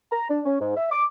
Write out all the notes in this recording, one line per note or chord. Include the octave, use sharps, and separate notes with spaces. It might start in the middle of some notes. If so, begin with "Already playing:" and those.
A#5
D4
C#4
G#2
E5
D6